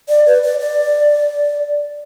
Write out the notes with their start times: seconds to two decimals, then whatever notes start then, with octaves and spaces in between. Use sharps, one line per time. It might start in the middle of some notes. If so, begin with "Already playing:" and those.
0.09 D5
0.26 B4
0.43 D5
0.60 D5